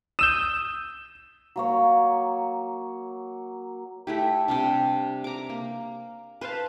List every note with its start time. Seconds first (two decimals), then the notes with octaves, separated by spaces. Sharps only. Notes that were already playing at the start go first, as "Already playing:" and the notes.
0.19 D#6 E6 G6 E7
1.56 F#3 A#3 C#5
4.07 A3 E4 G4
4.48 C3 G3 D4
5.24 A#5 D6
5.49 A#3
6.41 B4 C5 F5 A5